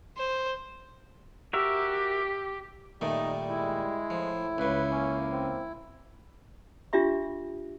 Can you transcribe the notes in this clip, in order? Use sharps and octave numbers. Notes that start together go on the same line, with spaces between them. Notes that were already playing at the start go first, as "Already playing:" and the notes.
C5
F#4 G4 A#4 E5
A#2 D#3 G3 A3 D#4
G#3 E4
A2 F3
C#2 C#3 B4
A#3 C#4
C4
D4 F4 G4 E5 C6